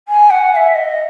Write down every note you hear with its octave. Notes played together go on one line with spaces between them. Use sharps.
G#5
F#5
F5
E5
D#5